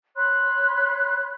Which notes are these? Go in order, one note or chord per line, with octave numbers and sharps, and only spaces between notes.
C#5 B5 C6 F#6